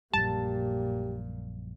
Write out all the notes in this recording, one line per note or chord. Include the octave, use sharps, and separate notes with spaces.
A#1 F#2 A#2 G3 G4 A5